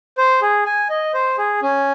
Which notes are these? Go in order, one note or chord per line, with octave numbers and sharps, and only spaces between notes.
C5
G#4
G#5
D#5
C5
G#4
C#4